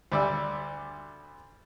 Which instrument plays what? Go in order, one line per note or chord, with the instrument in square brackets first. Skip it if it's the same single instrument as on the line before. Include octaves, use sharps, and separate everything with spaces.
[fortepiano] D2 G3 D5 E6